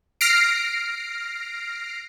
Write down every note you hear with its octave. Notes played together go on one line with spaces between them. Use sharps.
F6 A#6 C7 D7